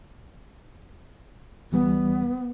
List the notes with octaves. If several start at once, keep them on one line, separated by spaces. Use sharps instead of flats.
D2 E3 G3 B3